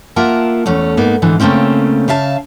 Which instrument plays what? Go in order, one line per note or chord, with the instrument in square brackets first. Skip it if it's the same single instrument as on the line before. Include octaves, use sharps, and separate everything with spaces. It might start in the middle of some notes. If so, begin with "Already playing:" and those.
[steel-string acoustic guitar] A#3 F4 A#4 E5 F#5 A5
E2 A3 C#4
G#2 A#3 B3 D#4
G#2 D3 E3
C#3 A3 A#3 C4 C#4
C#3 E5 F5 A5